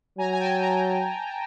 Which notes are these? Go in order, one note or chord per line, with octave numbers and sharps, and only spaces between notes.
F#3 G#5 A#5
G#5
G5 A5
G#5 A#5